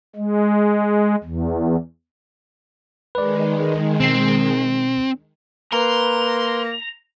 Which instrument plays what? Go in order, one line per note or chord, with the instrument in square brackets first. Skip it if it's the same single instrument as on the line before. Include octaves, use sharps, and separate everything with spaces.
[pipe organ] G#3
E2
[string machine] D#3 G#3 [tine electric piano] B4 D5
[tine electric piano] B2 C7 [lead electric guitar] C4
[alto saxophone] A#3 [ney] B4 [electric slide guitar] A#5 [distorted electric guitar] C6